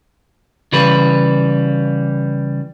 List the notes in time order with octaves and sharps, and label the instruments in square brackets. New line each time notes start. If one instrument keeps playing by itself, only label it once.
[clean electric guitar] C#3 E3 G3 B4